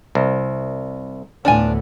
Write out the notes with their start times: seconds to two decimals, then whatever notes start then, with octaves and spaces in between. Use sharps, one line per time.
0.15 C2
1.45 D2 A2 B3 D4 F4 G#5